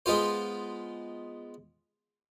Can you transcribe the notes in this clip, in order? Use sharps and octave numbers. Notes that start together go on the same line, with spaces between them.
G#3 B3 F4 C5